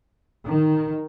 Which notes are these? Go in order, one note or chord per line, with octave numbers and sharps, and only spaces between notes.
D#3